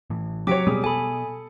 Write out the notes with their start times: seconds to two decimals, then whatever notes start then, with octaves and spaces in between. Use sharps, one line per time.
0.10 A2 E3
0.47 F#3 G4 C#5 D6 B6 D7
0.67 B2 G3 B3 G#4 D#6
0.84 A4 G#5 B5